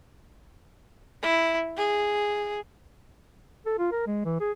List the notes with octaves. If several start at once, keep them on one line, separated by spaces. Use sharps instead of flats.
E4
G#4
A4
F4
A#4
G#3
E3
G#4